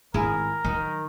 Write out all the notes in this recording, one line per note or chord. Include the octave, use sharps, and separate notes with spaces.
G#1 E4 G#4 A#4
D#3 F#3